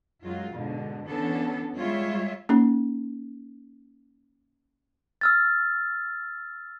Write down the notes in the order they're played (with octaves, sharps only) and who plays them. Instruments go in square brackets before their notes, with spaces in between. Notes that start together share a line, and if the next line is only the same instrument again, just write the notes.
[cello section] F#2 F#3 G#3 F4
G#2 B2 D3
D3 E3 B3 C#4 D4 A4
G3 G#3 F4 C#5 E5
[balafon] A#3 C#4 D#4
[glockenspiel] E6 F6 A6